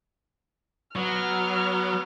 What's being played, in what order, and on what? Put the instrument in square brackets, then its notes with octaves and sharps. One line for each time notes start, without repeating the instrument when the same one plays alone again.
[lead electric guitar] F#3 [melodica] B3 [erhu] F6